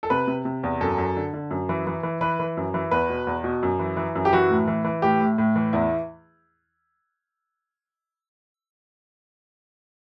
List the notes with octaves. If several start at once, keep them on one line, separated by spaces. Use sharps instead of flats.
A4
C3 B4
C3
C3
E2
F#2 A4
F#2
D3
D3
F#2
E3
E3
E3
E3 B4
E3
F#2
E3
E2 B4
B2
E2
B2
F#2
E3
E3
F#2
G4
E3 F#4
A2
E3
E3
A2 G4
A2
A2
E3
E2 E4